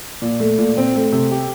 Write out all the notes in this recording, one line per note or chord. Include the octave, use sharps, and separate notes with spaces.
A#2
A3
A#2
C4
A3
C3
G4